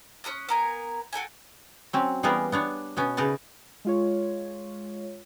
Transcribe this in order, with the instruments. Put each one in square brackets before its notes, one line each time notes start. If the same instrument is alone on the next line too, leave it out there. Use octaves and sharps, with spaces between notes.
[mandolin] C#4 G#4 D#6 F#6
B3 A#4 G#5
F#4 A4 G5 G#5
[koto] F#3 C4 C#4
E3 G3 A#3 B3 G#4 A#4
B3 D4 C#5
B2 B3 C#4
C#3 D#4 A#4 B4 A5
[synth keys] G#3 F4 C#5